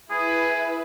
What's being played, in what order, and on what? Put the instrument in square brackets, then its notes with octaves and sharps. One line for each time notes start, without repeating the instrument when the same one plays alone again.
[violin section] E4 B4 [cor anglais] G#4